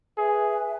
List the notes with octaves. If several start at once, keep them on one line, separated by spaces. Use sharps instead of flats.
G#4 B4 E5 G#5